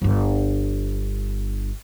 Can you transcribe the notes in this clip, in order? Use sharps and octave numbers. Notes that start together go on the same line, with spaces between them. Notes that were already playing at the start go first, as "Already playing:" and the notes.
G1 D4